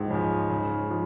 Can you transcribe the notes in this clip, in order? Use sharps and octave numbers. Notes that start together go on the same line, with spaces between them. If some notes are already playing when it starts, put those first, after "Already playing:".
Already playing: C#2 G#2 F3
C#3 F3
C#3
F3